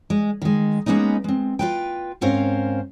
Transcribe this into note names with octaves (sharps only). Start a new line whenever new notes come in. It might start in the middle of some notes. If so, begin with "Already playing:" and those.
G#3
D#3 G#3
G#3 A#3 B3 C#4 D#4
G#3 C4
F4 B4 G5
G#2 C4 C#4 A#4 C5 F5